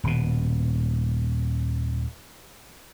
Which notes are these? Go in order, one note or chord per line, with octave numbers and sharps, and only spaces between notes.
D#1 B2